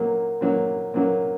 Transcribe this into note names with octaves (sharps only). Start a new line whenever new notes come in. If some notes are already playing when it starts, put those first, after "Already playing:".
Already playing: A#2 F#3 A#3
A#2 F#3 A#3
A#2 F#3 A#3